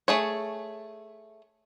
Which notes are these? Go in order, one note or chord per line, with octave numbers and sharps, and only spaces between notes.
A3 G#4 C#5